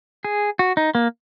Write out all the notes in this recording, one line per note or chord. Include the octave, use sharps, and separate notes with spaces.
G#4
F#4
D#4
A#3